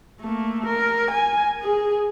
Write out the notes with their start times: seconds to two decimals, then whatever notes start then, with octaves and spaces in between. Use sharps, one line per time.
0.21 A3 A#3
0.66 A#4
1.11 G#5
1.62 G#4